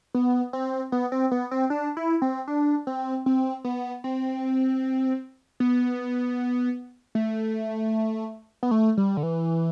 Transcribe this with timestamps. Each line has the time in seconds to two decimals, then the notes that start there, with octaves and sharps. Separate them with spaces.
0.15 B3
0.53 C4
0.92 B3
1.12 C4
1.31 B3
1.51 C4
1.70 D4
1.97 E4
2.22 C4
2.48 D4
2.87 C4
3.26 C4
3.64 B3
4.04 C4
5.60 B3
7.15 A3
8.63 B3
8.71 A3
8.97 G3
9.17 D3
9.23 E3